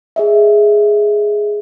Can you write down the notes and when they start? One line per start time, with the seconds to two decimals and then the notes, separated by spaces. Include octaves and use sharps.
0.16 G#4 D#5 E5